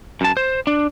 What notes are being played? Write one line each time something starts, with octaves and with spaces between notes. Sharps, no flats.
F#2 A5
C5
D4